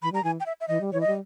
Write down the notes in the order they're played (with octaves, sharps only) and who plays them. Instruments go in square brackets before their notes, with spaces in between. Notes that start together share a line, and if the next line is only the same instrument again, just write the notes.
[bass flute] E3 [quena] B5
[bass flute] G3 [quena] A#5
[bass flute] E3 [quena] G#5
[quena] G5
E5
E5
[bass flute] E3 [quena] D#5
[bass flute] G3
[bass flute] E3 [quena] C#5
[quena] D#5
[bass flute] G3